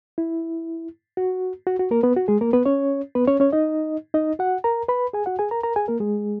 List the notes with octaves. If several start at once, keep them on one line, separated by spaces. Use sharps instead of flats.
E4
F#4
F#4
F#4
A#3 A#4
B3 B4
F#4
G#3 G#4
A#3 A#4
B3 B4
C#4 C#5
B3 B4
C#4 C#5
C#4 C#5
D#4 D#5
D#4 D#5
F#4 F#5
A#4 A#5
B4 B5
G#4 G#5
F#4 F#5
G#4 G#5
A#4 A#5
A#4 A#5
G#4 G#5
A#3 A#4
G#3 G#4